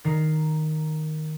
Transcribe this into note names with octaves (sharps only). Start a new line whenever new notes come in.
D#3 A#5 C7